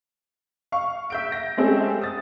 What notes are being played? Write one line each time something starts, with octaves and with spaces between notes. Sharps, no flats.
F5 C#6
E5 G6 D7
A#6
G#3 A3 C4 C#4 G4
D#6 A6